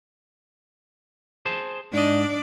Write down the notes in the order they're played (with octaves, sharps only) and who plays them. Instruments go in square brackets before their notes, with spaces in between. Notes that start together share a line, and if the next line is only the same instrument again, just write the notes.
[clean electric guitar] G#4 C5 A5
[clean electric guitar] G#2 D#5 [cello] D4 D5